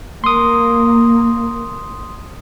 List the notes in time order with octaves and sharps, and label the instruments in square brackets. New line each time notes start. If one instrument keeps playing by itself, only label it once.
[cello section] A#3 [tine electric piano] C6 D#6